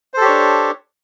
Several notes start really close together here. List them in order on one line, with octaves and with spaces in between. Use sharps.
C5 A4 G4 C#5 D4